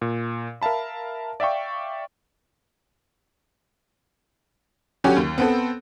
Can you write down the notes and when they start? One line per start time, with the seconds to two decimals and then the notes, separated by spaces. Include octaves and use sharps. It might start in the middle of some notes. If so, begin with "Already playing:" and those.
0.02 A#2
0.62 A#4 E5 F5 A5 B5
1.40 D5 E5 F5 G5 C#6
5.04 D3 F#3 C#4 F#4 G4
5.16 D#2
5.38 B3 C4 A4